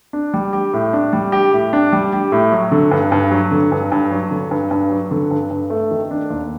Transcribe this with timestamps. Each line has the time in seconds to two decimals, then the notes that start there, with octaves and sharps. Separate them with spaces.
0.13 D4
0.34 G3
0.53 G4
0.73 A2
0.93 D4
1.13 G3
1.32 G4
1.53 A2
1.73 D4
1.93 G3
2.13 G4
2.32 A2
2.52 F#3
2.72 D3
2.91 G2
3.12 G2
3.31 F#3
3.51 D3
3.72 G2
3.92 G2
4.11 F#3
4.31 D3
4.51 G2
4.71 G2
4.91 F#3
5.11 D3
5.31 G2
5.51 G2
5.70 A3
5.91 D#3
6.11 D4
6.30 D#2